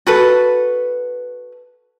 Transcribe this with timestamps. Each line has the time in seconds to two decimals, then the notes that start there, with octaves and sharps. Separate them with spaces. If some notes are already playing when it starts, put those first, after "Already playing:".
0.07 F#4 A4 B4